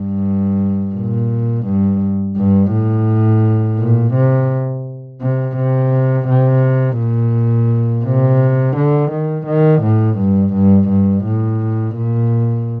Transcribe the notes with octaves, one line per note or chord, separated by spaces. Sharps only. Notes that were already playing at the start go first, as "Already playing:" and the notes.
Already playing: G2
A#2
G2
G2
A2
A#2
C3
C3
C3
C3
A#2
C3
D3
D#3
D#3
A2
G2
G2
G2
A2
A#2